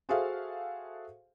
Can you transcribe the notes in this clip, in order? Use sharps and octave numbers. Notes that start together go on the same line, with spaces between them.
F#4 G#4 A4 C5 E5 F5